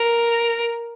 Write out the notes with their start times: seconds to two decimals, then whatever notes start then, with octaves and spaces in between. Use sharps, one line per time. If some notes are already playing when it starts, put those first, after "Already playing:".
Already playing: A#4